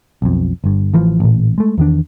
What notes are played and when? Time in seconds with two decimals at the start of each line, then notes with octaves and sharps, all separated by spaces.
0.22 B1 F2
0.64 G1 G2
0.94 A1 E3 F3
1.20 A1 A#2
1.58 G#3 A3
1.78 E2 D#3 D4